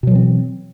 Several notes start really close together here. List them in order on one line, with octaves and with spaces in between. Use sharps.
B2 F#3 E3 C4